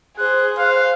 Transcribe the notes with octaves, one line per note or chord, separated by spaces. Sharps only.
G#4 C5 F#6
C5 F5